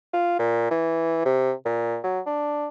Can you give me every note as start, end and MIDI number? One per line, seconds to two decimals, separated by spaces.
0.13 0.35 65
0.39 0.67 46
0.71 1.23 52
1.26 1.53 48
1.66 1.99 46
2.04 2.20 54
2.26 2.68 62